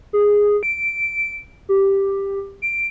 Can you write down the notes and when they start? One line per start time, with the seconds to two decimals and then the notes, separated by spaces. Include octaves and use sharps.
0.13 G#4
0.63 D7
1.69 G4
2.62 D7